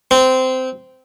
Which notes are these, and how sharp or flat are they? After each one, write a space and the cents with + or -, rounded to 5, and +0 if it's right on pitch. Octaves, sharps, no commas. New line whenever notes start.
C4 -15